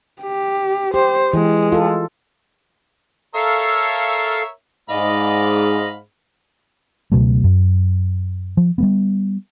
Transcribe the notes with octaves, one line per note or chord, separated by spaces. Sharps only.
G4
G4 C5
E3 G#3
F4 A4
A4 A#4 C#5 E5 F5
G#2 D5 D#5 F5 B5
C#2 B2 F#3 A3
F#2
F3
G3 A#3 B3